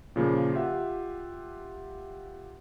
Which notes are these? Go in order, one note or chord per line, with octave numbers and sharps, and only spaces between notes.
A#2 C#3 F3 A#3
F4 G4 E5 F#5